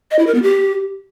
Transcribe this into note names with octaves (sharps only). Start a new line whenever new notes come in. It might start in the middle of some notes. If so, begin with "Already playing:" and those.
D#5
E4
A#4
B3
G4